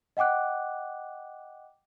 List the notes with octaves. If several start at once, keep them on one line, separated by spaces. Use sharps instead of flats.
D#5 F#5 G5 D6 F#6